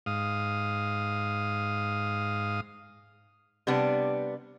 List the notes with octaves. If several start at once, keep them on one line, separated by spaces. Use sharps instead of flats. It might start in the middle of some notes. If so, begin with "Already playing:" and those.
G#2 F5 D#6
C3 G3 B3 D4